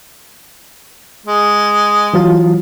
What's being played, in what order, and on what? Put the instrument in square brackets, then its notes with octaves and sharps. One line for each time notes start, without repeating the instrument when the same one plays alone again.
[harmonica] G#3
[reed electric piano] E3 F#3 F4